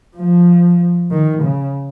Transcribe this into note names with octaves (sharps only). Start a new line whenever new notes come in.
F3
D#3
C#3